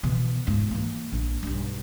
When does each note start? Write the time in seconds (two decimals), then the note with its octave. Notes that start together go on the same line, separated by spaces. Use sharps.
0.03 B2 E3
0.47 G#2 F4
0.71 E3 A#3
1.12 A#1
1.43 B1 G2